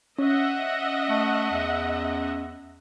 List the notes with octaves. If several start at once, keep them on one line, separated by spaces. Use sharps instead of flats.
C#4 D#5 E5 F#5
A3
E2